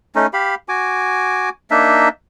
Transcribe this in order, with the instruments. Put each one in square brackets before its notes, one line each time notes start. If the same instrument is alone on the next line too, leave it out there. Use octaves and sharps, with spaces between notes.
[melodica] A3 C#4 D#4
G4 F5 B5
F#4 G#5 D6
A#3 D4 D#4 E5